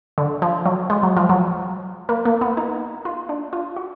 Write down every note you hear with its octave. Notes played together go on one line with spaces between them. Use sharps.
D3
F3
F#3
G#3
F#3
F3
F#3
A#3
A#3
B3
D#4
F4
D4
F4
F#4